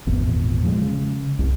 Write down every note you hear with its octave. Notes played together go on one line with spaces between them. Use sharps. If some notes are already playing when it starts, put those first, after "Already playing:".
G#1 E2 A#2
F3 G#3
C#3
C2